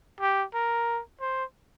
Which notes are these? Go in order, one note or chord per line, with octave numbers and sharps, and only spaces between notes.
G4
A#4
C5